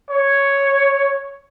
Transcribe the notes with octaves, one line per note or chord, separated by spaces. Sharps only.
C#5